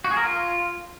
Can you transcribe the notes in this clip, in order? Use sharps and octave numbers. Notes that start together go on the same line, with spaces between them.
F#4
G#4
A#4
F4